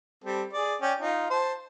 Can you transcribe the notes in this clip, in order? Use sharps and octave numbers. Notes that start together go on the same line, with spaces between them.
G3 C4 A4
G#4 D5
C#4 D5 G5
D#4 F4
C5 A5